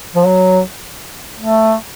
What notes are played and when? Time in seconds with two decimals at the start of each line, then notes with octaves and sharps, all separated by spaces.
0.15 F3
0.26 F#3
1.40 A3